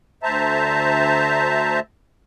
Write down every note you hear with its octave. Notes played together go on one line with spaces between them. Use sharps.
D2 C5 E5 A5 A#5